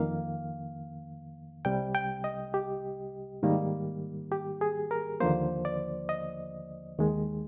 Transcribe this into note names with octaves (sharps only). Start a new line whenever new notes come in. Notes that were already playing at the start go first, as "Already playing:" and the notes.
Already playing: F2 D#3 A#3 F5
C2 C3 G3 G5
G5
D#5
G4
G#2 D#3 G3 A#3
G4
G#4
A#4
D#2 D3 F3 A#3 C5
D5
D#5
D#2 D#3 G#3